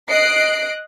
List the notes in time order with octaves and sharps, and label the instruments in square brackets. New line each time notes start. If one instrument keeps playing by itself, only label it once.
[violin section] D#5 F#6 C7 D7